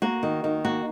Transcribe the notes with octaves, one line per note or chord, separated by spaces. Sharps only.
A#3 F#4
D#3
D#3
A#3 F#4